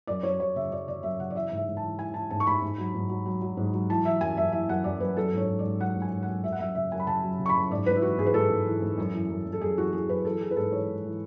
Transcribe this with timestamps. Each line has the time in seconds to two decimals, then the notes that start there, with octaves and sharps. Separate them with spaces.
0.07 F#2 D5
0.23 F#3 C#5
0.39 F#2 C#5
0.56 C#3 E5
0.71 F#2 D5
0.87 C#3 D5
1.03 F#2 E5
1.19 C#3 F#5
1.30 D5
1.35 E3 E5
1.52 G#2 E5
1.67 G#2
1.77 A5
1.82 E3
1.99 E3 G#5
2.14 E3 A5
2.30 G#2 A5
2.40 C#6
2.47 G#2 B5
2.62 G#2
2.78 F#3
2.94 G#2
3.09 F#3
3.26 F#3
3.42 F#3
3.57 G#2
3.73 F#3
3.90 E3 A5
4.05 E3 E5
4.21 F#2 G#5
4.37 F#2 E5
4.52 E3 E5
4.69 F#2 F#5
4.84 F#2 D5
5.00 F#2 B4
5.17 F#3 A4
5.33 G#2 C#5
5.48 G#2
5.59 G#2 D5
5.80 F#3 F#5
5.96 G#2
6.02 G#5
6.11 G#2
6.23 F#5
6.28 F#3
6.44 F#2 E5
6.52 F#5
6.59 F#2 E5
6.75 C#3 E5
6.92 F#2 G#5
7.00 B5
7.07 C#3 A5
7.23 F#3
7.39 C#3
7.46 C#6
7.49 B5
7.55 F#2
7.70 G#2 D5
7.86 G#2 B4
7.96 E4
8.02 E3 F#4
8.18 G#2 G#4
8.26 B4
8.34 G#2 A4
8.50 G#2
8.66 E3
8.82 G#2
8.98 F#2
9.14 E3
9.29 F#2
9.46 F#2
9.53 A4
9.61 F#2 G#4
9.78 E3 F#4
9.93 E3 G#4
10.09 F#2 B4
10.25 E3 A4
10.41 E3 G#4
10.51 B4
10.56 G#2 A4
10.72 E3 C#5
10.88 G#2
11.04 E3